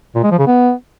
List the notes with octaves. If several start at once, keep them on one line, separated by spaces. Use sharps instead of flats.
A#2
G#3
F3
C#3
B3